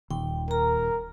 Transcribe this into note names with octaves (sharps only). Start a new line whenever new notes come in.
D#1 D#2 G5
A#4 A#5